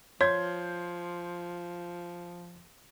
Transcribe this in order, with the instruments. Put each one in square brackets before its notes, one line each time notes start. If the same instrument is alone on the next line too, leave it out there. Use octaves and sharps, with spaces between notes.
[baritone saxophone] F3 [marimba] C#5 [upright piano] C6 G6 G#6